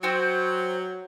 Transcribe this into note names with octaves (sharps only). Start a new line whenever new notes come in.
F#3 C4 F#4 C5